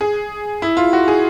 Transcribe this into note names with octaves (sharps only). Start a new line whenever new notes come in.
G#4
E4
F4
F#4
G#4